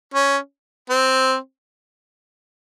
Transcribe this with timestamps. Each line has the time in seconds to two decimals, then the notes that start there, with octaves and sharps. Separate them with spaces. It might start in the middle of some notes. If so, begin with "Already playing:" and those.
0.14 C#4
0.90 C4